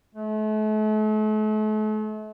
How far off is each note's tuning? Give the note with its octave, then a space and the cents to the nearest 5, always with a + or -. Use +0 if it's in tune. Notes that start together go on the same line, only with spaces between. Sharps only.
A3 -40